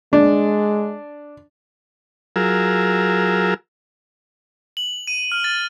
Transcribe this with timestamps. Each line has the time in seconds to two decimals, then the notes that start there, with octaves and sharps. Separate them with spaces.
0.13 G#3 D4
2.36 F#3 F4 G#4 A#4 E6
4.77 F#7
5.07 D#7
5.32 F6
5.44 A6